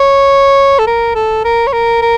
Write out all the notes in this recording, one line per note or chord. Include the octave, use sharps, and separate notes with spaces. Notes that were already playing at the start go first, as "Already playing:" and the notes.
Already playing: C#5
A4
A#4
A4
A#4
C#5
A#4
A#4